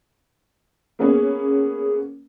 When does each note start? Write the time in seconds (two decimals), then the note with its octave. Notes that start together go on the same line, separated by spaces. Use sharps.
0.99 A#3 B3 C#4 G#4